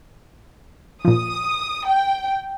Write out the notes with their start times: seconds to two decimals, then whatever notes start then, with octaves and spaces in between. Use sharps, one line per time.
1.05 A#2 F3 D#6
1.87 G5